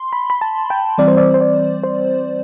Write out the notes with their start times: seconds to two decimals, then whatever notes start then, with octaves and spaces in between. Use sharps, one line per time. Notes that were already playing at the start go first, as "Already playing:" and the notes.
Already playing: C6
0.13 B5
0.30 B5
0.41 A5
0.70 G5
0.98 E3 G3 C4 D5
1.08 C5
1.17 D5
1.34 C5
1.41 D5
1.84 C5